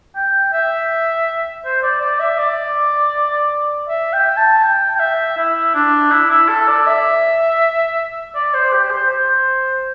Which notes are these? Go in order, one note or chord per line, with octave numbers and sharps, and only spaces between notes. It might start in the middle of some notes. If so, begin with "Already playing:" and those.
G5
E5
C5
D5
D5
E5
D5
E5
G5
A5
G5
G5
E5
E4
D4
E4
E4
A4
D5
E5
D5
C5
G4
C5
C5